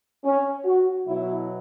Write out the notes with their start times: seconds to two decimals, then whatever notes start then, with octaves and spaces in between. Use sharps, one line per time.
0.25 C#4
0.65 F#4
1.07 B2 F#3 E4